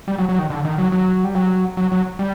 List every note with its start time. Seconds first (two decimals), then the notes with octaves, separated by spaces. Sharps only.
0.08 G3
0.18 F#3
0.29 F#3
0.39 D#3
0.50 D3
0.65 D#3
0.78 F#3
0.92 F#3
1.24 G3
1.35 F#3
1.77 F#3
1.92 F#3
2.19 G3